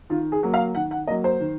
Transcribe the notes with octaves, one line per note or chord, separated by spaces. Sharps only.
D#3 F4
G#4
F#3 A#3
F5
D#3 F#5
F#5
F#3 A#3 D#5
C5
D#3